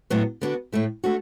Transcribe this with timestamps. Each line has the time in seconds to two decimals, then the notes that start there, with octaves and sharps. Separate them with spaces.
0.10 A2 F#3 B3 F#4
0.41 D3 B3 D4 F#4
0.72 A2 A3 E4
1.04 A3 D4 F#4